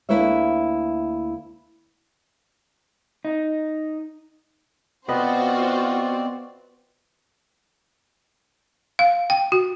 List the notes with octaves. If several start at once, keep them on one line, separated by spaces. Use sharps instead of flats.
D2 A#3 E4 B4 C#5 E5
D#4
B3 C4 F4 F#4 B4 C5 D5 D#5
F5
G5
F#4